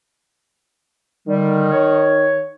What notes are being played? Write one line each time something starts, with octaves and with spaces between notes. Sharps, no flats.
D3 D#3 G3
C#5